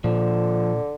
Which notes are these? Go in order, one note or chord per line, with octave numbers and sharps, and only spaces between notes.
A#2 D3 F3